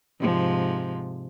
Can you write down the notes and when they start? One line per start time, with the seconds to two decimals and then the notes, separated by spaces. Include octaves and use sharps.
0.20 G#2 C3 F3